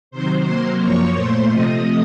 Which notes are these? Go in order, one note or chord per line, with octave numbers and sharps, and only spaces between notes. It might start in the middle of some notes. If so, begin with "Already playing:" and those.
C3 D#3 F#3 C5 C6
C3 F#3 A#3
F#2 F3 A#3 C#5 C#6
A#2 A3 C5 C6
C3 F3 A3 D#5 D#6